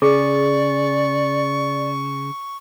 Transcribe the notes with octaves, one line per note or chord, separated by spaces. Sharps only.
C#3 G#4 D5 C#6